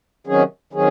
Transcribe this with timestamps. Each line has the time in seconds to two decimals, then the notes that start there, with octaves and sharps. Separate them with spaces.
0.27 C3 D#3 F#3 C#4 G#4
0.73 C3 D#3 F#3 C#4 G#4